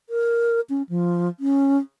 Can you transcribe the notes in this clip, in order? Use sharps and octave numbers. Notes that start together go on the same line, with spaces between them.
A#4
C#4
F3
C#4